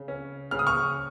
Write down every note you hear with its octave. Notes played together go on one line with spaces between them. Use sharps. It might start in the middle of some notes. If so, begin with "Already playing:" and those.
Already playing: C#3
C#4
C#3 F6
D#6
C#6 F6